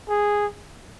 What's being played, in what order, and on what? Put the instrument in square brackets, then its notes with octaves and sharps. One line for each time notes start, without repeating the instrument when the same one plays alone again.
[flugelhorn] G#4